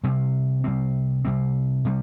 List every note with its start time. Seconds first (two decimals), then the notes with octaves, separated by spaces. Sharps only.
0.03 C3 G3 C4
0.64 C3 G3 C4
1.25 C3 G3 C4
1.85 C3 G3